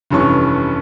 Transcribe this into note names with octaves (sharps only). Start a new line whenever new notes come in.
F1 G2 E3 C#4 C#6